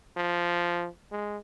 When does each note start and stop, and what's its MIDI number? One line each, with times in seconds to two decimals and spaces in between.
0.17 0.87 53
1.12 1.38 56